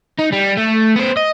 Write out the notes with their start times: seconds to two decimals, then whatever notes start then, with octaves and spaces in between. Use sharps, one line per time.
0.19 D#4
0.33 G3
0.58 A3
0.96 B3 C5
1.17 D#5